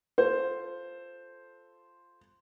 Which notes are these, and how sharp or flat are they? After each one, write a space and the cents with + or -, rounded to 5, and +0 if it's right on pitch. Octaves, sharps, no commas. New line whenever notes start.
F4 +0 A4 +0 C5 +0